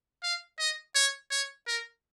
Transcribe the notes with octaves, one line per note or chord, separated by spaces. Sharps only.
F5
D#5
C#5
C#5
A#4